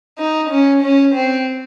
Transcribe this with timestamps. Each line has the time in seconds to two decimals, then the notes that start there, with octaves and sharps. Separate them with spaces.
0.18 D#4
0.50 C#4
0.82 C#4
1.15 C4